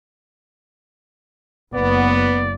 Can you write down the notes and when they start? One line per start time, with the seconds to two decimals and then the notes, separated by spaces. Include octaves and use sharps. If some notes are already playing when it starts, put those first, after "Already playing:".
1.74 F#1 B3 D5